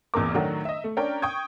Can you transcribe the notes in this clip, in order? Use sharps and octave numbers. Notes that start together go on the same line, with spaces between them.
A1 E2 A#2 A#4 D6
A2 D#3 F#3 A3 D4 F#4
D#5 E5
A3
C#4 D4 A#4 G5
G5 C#6 D#6 G#6